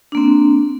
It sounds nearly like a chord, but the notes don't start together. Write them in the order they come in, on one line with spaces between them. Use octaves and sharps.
D4 A#3 C4